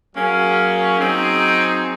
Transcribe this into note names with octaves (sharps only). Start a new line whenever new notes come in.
F#3 A#3 C#4 G#4
F#3 C4 D#4 G#4